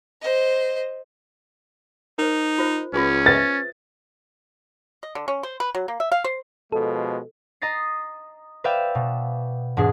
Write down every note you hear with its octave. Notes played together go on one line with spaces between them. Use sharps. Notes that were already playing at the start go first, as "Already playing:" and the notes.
C5 D#5
D#4 A#4 C5
F4 C5
C#2 C#4 F4 G#4 B4
B4 C5 E5 A6
D#5
D3
C#4
C5
B4
F#3
A#3
E5
F5
C5
B2 F3 G#3 A4
D#5 A#5 D#6 A6 C7
B4 C5 D5 E5 F5 G5
B2
E1 G#2 B2 D4 G#4